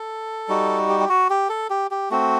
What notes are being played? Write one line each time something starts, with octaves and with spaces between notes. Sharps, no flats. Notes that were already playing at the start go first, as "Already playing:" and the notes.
Already playing: A4
G3 D#4 F#4
G4
G4
F#4
G4
A4
G4
G4
A3 C4 F#4